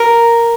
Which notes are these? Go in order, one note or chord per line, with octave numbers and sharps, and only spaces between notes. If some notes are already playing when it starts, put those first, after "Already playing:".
Already playing: A#4